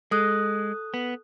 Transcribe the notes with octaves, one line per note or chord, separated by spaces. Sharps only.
G#3 A4 D#6 F#6
B3